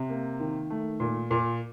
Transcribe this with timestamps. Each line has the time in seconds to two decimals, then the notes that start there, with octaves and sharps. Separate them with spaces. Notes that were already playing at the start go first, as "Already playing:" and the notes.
Already playing: C3
0.10 A#3
0.40 D#3
0.70 A3
1.00 A#2
1.31 A#2